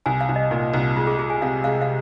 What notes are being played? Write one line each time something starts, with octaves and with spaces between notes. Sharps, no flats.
C2 G#5
F5
C2
D#5
A#2 D#4
C2 D#4
G#3 F4
G#4
G#3 G#4
G#5
C3 F5
G#3 F5
F5